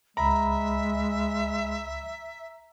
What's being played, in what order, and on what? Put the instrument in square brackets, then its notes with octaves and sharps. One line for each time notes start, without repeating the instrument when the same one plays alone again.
[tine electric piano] C#2 B5 [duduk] G#3 [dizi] E5 [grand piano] A#5